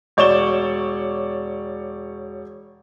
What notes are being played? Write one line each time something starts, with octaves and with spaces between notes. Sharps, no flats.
E1 C#5 D5 C#6 E7 G7